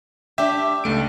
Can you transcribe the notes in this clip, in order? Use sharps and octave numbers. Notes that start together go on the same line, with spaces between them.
D4 G4 E5
C#2 A3 D7